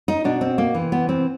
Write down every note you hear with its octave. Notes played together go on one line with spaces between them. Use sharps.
D#4
B2 D4
C4
A#3
C3 E3
B3
C4